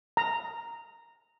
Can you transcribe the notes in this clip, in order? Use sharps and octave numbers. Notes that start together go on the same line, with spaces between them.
A#5